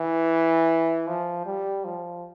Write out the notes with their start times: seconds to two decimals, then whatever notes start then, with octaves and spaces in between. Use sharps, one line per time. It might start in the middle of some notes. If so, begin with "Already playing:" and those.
Already playing: E3
1.08 F3
1.46 G3
1.84 F3